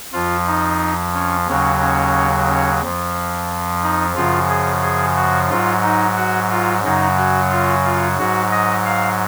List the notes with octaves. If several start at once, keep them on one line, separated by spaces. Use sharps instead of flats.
F2 F3 F4
D#4
C#4
D#2 C#3 F#3 C#4
C#4
C#4
F2 F3
D#4
F#2 C#3 F3 F4
G#4
G#4
F#4
G#2 F#3 F4
D#4
F#4
F4
F#2 C#3 F#3 D#4
F#4
F4
F4
G#2 F#3 F#4
D#5
F5